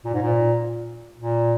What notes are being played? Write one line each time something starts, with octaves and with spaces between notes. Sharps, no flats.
A#2
G#2
A#2
A#2